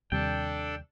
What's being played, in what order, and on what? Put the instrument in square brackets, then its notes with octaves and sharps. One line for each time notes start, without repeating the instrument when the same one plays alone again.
[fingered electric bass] D#2 C3 G3 [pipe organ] D4 A4 [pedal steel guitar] G5